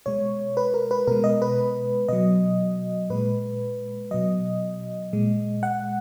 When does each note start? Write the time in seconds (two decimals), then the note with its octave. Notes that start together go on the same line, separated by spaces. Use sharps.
0.06 B2 G#3 C#5
0.57 B4
0.74 A#4
0.91 B4
1.07 B2 G#3 A#4
1.24 D#5
1.42 B4
2.09 B2 F#3 D#5
3.10 A#2 G#3 B4
4.11 B2 F#3 D#5
5.13 A#2 G#3
5.63 F#5